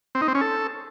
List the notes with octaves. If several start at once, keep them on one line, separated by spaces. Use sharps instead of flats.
C4
D#4
C4
C#4
A4